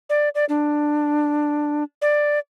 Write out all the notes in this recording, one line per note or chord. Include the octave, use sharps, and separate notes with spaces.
D5
D5
D4
D5